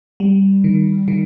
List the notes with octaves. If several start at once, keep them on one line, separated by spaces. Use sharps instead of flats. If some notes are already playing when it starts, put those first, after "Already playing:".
G3
D#3
D#3